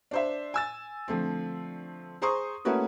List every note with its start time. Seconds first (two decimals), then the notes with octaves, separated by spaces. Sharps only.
0.11 D4 C5 E5
0.54 G#5 E6 A6
1.08 D3 F3 A3 C4
2.22 G#4 C5 A#5 C6 C#6 D#6
2.65 A3 A#3 C#4 E4 F#4 B4